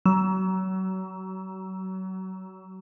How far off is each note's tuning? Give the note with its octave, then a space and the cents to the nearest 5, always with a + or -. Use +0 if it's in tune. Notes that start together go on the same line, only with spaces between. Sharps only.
F#3 +30